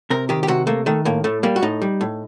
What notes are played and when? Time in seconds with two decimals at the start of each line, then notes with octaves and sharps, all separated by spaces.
0.10 C3 A#4
0.29 D#3 G4
0.43 G4
0.48 C3 F#4
0.67 A3 A#3
0.86 D#3 A3
1.05 A2 A#3
1.24 A2 A3
1.43 G3 A#3
1.56 F#4
1.62 A2 D#4
1.82 G3
2.01 A2